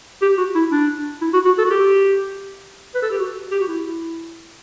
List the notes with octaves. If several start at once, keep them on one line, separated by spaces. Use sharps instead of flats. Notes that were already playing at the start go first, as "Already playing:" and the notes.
G4
F#4
E4
D4
E4
F#4
F#4
A4
F#4
G4
B4
A4
G4
F#4
G4
F#4
E4